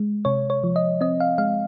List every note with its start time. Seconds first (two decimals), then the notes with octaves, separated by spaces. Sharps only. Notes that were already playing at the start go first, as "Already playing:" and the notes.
Already playing: G#3
0.25 C3 C#5
0.50 C#5
0.64 F3
0.76 D#5
1.01 C4 D#5
1.20 F5
1.38 G#3 F5